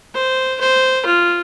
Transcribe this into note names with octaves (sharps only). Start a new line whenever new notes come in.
C5
C5
F4